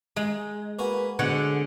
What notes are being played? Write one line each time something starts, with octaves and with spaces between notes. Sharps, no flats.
G#3 D#4
A#3 F#4 B4 G#5
B2 D3 G#4 C#5 F#5